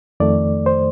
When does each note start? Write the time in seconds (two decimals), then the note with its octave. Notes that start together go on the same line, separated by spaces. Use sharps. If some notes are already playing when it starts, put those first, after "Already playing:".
0.20 F2 D#3 A3 D5
0.66 C5